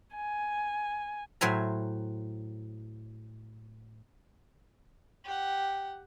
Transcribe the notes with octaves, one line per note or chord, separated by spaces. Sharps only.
G#5
A2 F#3 C5 E5 G#5 A#5
G4 F#5